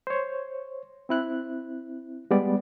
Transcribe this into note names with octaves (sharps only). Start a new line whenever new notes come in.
C5 C#5
C4 E4 F#6
G3 G#3 B3 D5